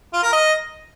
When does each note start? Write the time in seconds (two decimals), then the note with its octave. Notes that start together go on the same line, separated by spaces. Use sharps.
0.13 F4
0.23 A#4
0.33 D#5